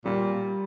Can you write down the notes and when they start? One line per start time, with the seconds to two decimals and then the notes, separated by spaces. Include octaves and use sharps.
0.05 A#2 G3